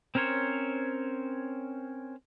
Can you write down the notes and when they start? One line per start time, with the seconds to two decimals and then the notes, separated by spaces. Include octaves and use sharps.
0.15 C4 C#4 A#4 C5 C#5